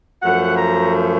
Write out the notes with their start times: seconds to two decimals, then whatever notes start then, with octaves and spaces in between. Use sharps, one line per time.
0.22 F#2 F3 A3 F#5
0.56 A#5